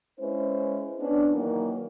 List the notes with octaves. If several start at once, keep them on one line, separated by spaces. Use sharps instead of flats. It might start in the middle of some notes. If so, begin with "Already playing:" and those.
G#3 C#4 E4 B4 C5
B3 C#4 D4
D#3 E3 F#3 A#3